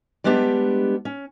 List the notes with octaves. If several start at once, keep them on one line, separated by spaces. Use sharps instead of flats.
G3 G#3 B3 D4 G4
C#4